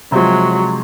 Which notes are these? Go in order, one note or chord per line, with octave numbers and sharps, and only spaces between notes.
C3 F3 F#3 G#3